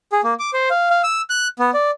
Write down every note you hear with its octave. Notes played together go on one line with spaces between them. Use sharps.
G#4
A#3
D6
C5
F5
F5
E6
F#6
B3
D5